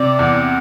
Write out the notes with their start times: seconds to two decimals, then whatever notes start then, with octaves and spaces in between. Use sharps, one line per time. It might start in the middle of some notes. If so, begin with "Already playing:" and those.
Already playing: C3 D5
0.19 E2